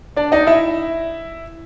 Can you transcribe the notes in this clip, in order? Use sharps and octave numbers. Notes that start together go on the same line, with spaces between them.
D4 D5
D#4 D#5
E4 E5